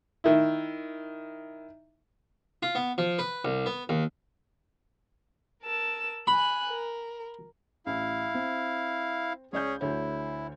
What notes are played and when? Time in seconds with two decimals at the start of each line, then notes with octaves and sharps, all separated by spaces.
0.24 D#3 E4
2.63 F4
2.75 B3
2.98 F3
3.19 B4
3.45 C2
3.66 B3
3.89 D#2
5.62 A#4 A5 E6
6.27 G#5 B5 F#6
6.68 A#4
7.86 A1 E4 F5
8.35 C4
9.53 C#2 C#4 G#4 C#5 D5 G6
9.81 D2 D3 E4 C#5